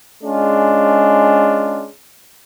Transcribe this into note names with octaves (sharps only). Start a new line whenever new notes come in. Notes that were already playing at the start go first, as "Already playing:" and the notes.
G#3 C#4 D4 F4